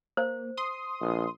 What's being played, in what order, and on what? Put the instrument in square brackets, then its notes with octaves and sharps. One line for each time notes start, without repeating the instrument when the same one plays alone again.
[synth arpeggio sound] A#3 [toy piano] C5
[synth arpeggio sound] C6 D#6
[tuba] A#1